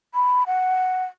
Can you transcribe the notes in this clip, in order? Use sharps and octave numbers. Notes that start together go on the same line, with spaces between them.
B5
F#5